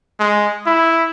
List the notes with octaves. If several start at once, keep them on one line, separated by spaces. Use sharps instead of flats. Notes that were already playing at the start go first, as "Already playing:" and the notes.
G#3
E4